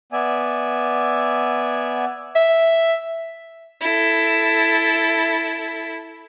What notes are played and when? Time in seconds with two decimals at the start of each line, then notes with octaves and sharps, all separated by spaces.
0.12 B3 D5 E5 G#5
2.36 E5
3.81 E4 A4